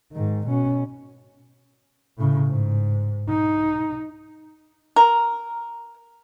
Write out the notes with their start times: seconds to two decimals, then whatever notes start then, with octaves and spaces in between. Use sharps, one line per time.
0.12 G#2 D#3
0.47 B2 C#4
2.17 A2 C#3
2.47 G#2
3.29 D#4
4.96 A#4